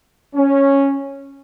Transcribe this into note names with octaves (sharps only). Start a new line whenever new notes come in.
C#4